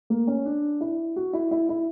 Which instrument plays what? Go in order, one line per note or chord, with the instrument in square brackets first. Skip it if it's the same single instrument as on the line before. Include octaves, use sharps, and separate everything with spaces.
[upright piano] A#3
C#4
D4
E4
F#4
E4
E4
E4